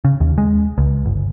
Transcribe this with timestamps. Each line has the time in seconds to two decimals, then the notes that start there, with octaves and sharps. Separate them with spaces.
0.05 C#3
0.20 D#2
0.38 G#3
0.78 C#2
1.06 G1